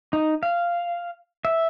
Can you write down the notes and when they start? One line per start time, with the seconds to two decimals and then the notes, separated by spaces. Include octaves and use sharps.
0.13 D#4
0.43 F5
1.45 E5